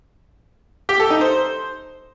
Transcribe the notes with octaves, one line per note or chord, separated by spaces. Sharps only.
G4
A4
D#4
C5